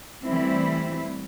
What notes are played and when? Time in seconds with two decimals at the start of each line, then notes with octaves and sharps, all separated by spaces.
0.25 E3 G3 A3 C4 E4